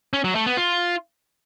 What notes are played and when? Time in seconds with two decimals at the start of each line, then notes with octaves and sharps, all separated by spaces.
0.13 C#4
0.24 F#3
0.35 A3
0.46 B3
0.57 F4